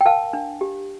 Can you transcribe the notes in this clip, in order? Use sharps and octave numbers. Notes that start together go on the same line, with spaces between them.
G5
A#4 F5 A5
D4
G4